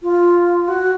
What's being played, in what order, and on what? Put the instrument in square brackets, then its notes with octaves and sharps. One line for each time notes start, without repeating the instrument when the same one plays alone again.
[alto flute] F4
F#4